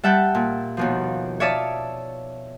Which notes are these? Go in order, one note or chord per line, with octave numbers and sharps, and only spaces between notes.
G3 E5 F#5 A5 G6
A#2
D#2 B2 F3
C#5 D5 E5 F5 A5 D#6